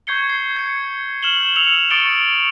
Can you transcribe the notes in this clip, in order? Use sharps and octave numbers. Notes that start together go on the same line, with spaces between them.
C#6 G6 G#6 C7 C#7 G7
C7
G#6 C#7
F6 E7 F#7 G7
E6 C#7 F7 F#7
C#6 D#6 A6 C#7 D7 G7